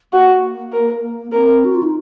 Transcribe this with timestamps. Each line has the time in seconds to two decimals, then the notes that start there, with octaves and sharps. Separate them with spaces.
0.13 A#3 F#4
0.73 A#4
1.32 C4 A#4
1.65 F#4
1.74 F4
1.83 D#4